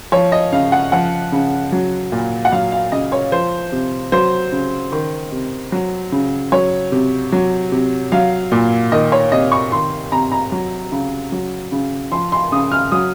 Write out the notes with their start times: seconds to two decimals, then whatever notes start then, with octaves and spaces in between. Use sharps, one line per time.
0.12 F3 C#5
0.32 D#5
0.52 C#3 F5
0.72 F#5
0.92 F3 F#5
1.32 C#3
1.72 F#3
2.12 A#2
2.45 F#5
2.52 F#3 F5
2.72 F5
2.92 C#3 D#5
3.12 C#5
3.32 F3 C5
3.72 C3
4.12 F#3 C5
4.52 C#3
4.92 D#3
5.32 C3
5.72 F#3
6.12 C#3
6.52 F#3 C#5
6.92 C3
7.32 F#3
7.72 C3
8.12 F#3 F5
8.52 A#2
8.92 D#3 D#5
9.12 C#5
9.32 C3 D#5
9.52 C#6
9.72 D#3 C6
10.12 C3 A#5
10.32 A#5
10.52 F#3
10.92 C#3
11.32 F#3
11.72 C#3
12.12 F3 C6
12.32 C6
12.52 C#3 D#6
12.72 F6
12.92 F#3 D#6